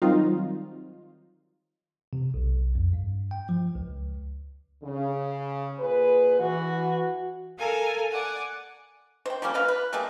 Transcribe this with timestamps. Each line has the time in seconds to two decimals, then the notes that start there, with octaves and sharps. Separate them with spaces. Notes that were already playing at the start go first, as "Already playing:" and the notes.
0.02 D#3 F#3 G3 C4 D#4 F4
2.13 C3
2.34 B1
2.75 F2
2.93 G2
3.31 G5
3.49 F3
3.75 C#2
4.83 C#3
5.80 A#2 G#4 B4
6.40 E3 F#4
7.58 A4 A#4 F5 G#5
8.11 D5 F#5 G#5
9.26 C5 G5
9.42 F3 G3 A#3 C#4
9.54 F4 A#4 B4 F5
9.68 B4
9.93 G3 A3 A#3 G#4